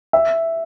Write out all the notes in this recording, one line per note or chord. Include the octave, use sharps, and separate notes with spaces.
E5